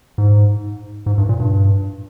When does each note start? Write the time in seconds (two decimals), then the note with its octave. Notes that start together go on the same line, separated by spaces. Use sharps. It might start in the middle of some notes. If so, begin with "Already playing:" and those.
0.18 G#2
1.06 G#2
1.18 G2
1.29 A#2
1.40 G2